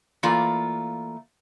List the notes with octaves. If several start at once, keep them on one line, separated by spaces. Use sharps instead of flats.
E3 A3 A#3 F4 D5